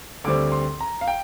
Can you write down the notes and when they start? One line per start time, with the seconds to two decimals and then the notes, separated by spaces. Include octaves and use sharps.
0.24 D2 D3 G3 C4 D6
0.52 C6
0.81 A#5
1.01 F5
1.08 G5